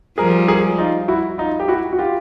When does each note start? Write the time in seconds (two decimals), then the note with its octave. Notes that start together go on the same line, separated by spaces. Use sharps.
0.18 F3 G3 G#4 A#4
0.48 G#4 A#4
0.78 D#4 F4
1.08 E4 F#4
1.38 D#4 F4
1.60 G4
1.68 E4 F#4
1.93 F#4
1.98 F4 G4